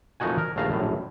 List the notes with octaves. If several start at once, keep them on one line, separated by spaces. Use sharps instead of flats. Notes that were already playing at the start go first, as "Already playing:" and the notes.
F2 A#2 A3 D#4 F#4 G#5
A#4
A#1 D#2 A3 F5 A#5
A#1 F#2 A2